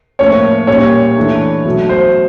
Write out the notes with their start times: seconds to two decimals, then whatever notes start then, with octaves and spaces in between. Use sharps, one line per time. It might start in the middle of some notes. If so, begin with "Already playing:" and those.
0.19 A2 F3 A#3 C#4 C#5
0.67 A#2 G3 A#3 C#4 C#5
1.16 E3 A3 D4
1.65 B2 F#3 A3
1.89 C5